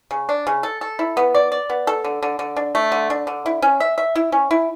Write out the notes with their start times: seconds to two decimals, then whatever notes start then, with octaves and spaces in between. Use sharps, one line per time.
0.11 C#3
0.29 D4
0.47 C#3
0.63 A4
0.81 A4
0.99 E4
1.17 B3
1.35 D5
1.52 D5
1.70 B3
1.87 A4
2.05 D3
2.23 D3
2.39 D3
2.56 D4
2.75 A3
2.92 D3
3.10 D4
3.27 D3
3.46 E4
3.62 C#4
3.80 E5
3.98 E5
4.16 E4
4.32 C#4
4.51 E4